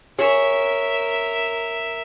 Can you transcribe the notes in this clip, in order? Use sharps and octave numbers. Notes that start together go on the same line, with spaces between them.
G#4 A#4 C#5 E5